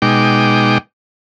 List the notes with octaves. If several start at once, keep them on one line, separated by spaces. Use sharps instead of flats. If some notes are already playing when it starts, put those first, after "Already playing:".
B2 G#3 D#4 G5 D6